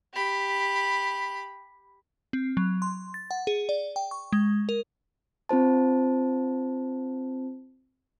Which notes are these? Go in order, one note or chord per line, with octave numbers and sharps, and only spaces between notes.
G4 B5
C4
F#3
C6
A6
F#5
G#4
D5
G5
C#6
G#3
A#4
C4 F4 C5 A5